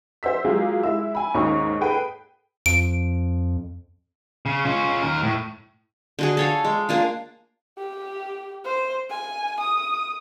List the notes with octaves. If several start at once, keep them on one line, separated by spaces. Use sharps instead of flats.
C5 E5 E6 B6
F#3 G#3 A#3 F4 G4 G#4
G#3 E4 E5 E6
G#5 B5
D#2 G#2 C#4 D#4 C#6 D#6
G#4 A4 B4 G5
F2 D7
C#3
C#4 F4
D#2 A#4
A2
D3 F#4 G#4
A4 C#5 F5
G#3
A#3 D4 F4
G4
C5
G#5
D#6